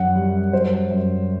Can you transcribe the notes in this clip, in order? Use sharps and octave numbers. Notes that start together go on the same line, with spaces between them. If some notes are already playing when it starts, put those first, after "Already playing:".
Already playing: F#2 F#5
G3
F#2 C5
F#2